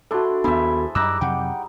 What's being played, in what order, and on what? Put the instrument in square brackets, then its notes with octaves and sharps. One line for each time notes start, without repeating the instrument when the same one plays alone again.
[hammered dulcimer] D4 E4 C6 [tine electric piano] F#4 A4
[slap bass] D#2 D4 [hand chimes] B3 B5 [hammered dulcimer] G#4 C5 E5
[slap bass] F#2 [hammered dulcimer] G3 D#4 [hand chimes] D6 [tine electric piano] E6 F#6 A#6
[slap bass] F2 C3 F#3 [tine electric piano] F#5 G5